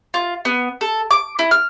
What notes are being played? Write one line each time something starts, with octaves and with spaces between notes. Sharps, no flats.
F4
B3
A4
D6
E4
F6